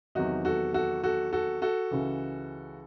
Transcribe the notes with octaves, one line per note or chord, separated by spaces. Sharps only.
E2 C3 D#3 F#3 D#4 F#4
F#4 A4
F#4 A4
F#4 A4
F#4 A4
F#4 A4
C#2 C#3 E3